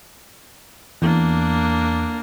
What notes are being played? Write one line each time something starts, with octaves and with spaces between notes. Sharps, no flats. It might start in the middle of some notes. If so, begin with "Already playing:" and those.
E2 A#3 D4